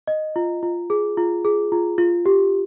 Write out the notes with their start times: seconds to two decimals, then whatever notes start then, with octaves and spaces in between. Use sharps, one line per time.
0.07 D#5
0.36 F4
0.63 F4
0.90 G#4
1.17 F4
1.45 G#4
1.72 F4
1.98 F4
2.26 G4